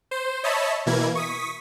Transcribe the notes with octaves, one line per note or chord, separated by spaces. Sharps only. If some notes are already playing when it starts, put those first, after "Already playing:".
C5
C#5 D#5 E5 A5 B5
B2 E3 A#3 E4 G#6
C#6 D#6 B6